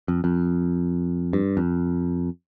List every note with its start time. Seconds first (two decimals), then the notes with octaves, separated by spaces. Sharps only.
0.08 F2
0.24 F2
1.33 G2
1.57 F2